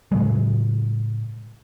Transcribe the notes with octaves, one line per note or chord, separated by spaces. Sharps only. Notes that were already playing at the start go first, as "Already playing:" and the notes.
A2 C#3 F#3 G#3